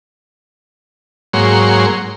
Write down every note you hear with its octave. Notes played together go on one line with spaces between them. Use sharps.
G#2 F#3 A#3 C#5 C6